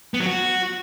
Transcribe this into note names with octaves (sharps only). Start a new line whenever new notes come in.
B3
F#3
F#4